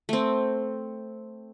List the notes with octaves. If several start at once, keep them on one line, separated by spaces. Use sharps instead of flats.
A3 C4